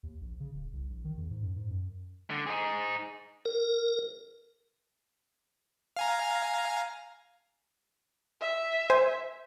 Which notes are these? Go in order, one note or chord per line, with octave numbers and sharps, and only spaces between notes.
D#2
A#1
C#3
D1
C2
A#1
D#3
E2
G#2
F#2
G#2
F#2
D3
D#4 G#4
A#4
F5 G#5 A#5
E5
C5 G#5